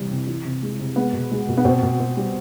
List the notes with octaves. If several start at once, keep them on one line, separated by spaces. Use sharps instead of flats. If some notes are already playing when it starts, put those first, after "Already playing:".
Already playing: C3 E3 G3
C3
E3
C3
G#3
C3
G#3 B3
B2
G#3
B2
B3
B2 C4
B2
B2
G3